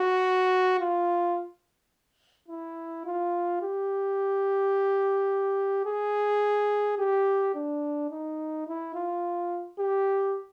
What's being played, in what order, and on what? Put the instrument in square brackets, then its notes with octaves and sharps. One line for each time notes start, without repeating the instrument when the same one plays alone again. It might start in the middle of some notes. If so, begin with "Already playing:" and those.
Already playing: [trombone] F#4
F4
E4
F4
G4
G#4
G4
D4
D#4
E4
F4
G4